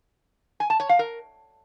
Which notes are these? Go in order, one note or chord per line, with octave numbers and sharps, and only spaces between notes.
G#5
A5
C#5
F5
A#4